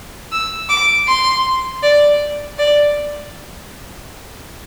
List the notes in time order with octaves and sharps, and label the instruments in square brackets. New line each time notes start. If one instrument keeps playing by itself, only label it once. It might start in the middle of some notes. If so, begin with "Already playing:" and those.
[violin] E6
D6
C6
D5
D5